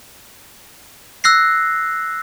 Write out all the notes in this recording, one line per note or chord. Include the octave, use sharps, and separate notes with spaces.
E6 F#6 A#6 C7